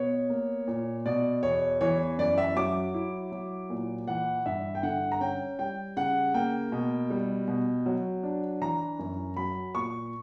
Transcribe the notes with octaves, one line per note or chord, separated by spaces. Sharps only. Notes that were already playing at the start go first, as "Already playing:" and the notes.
Already playing: B2 B3 C#5
A#3
A#2
B2 D5
E2 C#5
E3 C#5
F#2 D5
E5
F#3 D6
E4
F#3
A#2
E3 F#5
G2 E5
G5
D3 F#5
A#5
C#4 G5
G3 G5
C#3 F#5
A#3 G5
B2
G3
B2
F#3
D4
E3 A#5
F#2
F#3 B5
A#2 C#6